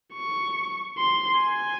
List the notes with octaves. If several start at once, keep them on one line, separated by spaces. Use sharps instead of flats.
C#6
C6
G#5